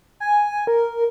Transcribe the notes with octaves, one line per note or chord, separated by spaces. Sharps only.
G#5
A#4